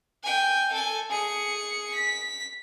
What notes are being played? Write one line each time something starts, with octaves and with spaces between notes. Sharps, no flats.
G5 G#5
A4 G#5
G#4 C#7
B6